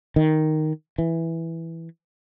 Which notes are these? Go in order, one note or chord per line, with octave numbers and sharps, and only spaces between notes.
D#3
E3